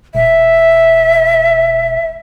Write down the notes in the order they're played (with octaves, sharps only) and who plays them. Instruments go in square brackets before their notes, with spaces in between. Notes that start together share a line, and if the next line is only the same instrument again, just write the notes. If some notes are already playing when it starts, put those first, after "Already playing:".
[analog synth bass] E1 [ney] E5